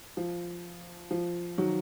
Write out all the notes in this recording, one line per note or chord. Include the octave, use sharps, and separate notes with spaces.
F3
F3
D#3 F#3